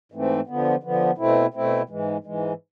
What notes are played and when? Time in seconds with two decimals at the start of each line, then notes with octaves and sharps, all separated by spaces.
0.12 G#2 E3 A3 C4
0.47 D3 F3 B3
0.83 D3 F3 B3
1.18 B2 A3 C4 E4
1.54 B2 A3 C4 E4
1.89 G#2 E3 G#3
2.24 G#2 E3 G#3